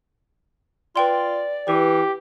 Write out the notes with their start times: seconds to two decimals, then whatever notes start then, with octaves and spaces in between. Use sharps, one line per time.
0.96 F4 B4 D5 G5 C6
1.68 E3 G4 B4